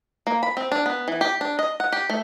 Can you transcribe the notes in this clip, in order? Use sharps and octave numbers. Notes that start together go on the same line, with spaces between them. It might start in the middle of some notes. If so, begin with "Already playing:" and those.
A#3
B5
C4
D4
B3
E3
G4
D4
D#5
F#5
G4
A3